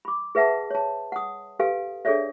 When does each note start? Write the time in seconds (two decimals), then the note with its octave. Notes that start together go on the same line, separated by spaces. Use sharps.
0.05 B5 D6
0.35 G#4 B4 E5 F#5 A5
0.71 C#5 A5
1.12 F#5 D#6
1.59 G4 A4 B4 F5 G#5
2.05 D4 G#4 A4 C#5 D5 E5